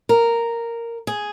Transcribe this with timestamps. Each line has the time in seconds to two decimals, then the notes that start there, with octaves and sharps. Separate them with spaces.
0.09 A#4
1.07 G#4